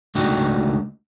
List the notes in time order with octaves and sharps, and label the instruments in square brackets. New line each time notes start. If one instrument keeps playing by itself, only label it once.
[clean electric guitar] C#2 A3 D4 D#4 F#4 G5